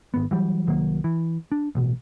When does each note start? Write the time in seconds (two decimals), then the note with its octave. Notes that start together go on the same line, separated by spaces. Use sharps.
0.14 G#1 B3
0.31 E3 F#3 G3
0.67 C2 D#3 F#3 A#3
1.04 E3
1.52 D4
1.75 A1 B2